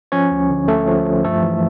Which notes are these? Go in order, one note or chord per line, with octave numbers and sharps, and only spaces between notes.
F3 C#4 C#5
D2
D3
D2 A3 A4
F3
F3
G2 A3 A4
E3